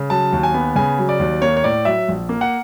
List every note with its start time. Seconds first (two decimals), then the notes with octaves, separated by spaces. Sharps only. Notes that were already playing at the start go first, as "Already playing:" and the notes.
Already playing: C#3
0.10 F#3 A5
0.32 D#2
0.43 G#5
0.54 B3
0.76 C#3 G#5
0.99 F#3
1.09 D5
1.19 D#2
1.42 A#3 C#5
1.57 C#5
1.64 A2 D5
1.85 F#3 E5
2.08 A#1
2.29 A#3
2.41 F#5